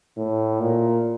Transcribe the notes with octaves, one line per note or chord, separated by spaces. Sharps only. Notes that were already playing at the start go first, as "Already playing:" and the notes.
A2
A#2